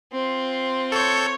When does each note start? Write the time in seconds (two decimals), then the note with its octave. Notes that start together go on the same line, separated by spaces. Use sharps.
0.12 C4 F4
0.92 A4 C#5 G6